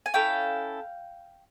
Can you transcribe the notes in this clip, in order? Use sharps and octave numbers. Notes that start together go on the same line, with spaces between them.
G#5
C#4 E4 A4 F5 G5